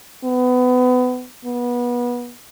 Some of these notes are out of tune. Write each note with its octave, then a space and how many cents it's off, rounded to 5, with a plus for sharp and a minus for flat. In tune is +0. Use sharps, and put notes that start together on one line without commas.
B3 +25
B3 -25